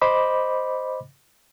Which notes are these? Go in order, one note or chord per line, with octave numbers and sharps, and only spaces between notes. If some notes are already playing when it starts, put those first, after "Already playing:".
C5 D#5 B5 D6